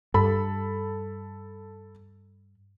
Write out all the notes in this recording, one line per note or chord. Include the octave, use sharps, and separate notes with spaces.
G2 A4 B5